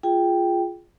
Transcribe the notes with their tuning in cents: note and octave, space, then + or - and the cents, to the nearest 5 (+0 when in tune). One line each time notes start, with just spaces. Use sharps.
F4 -5 G#4 +0 G5 +0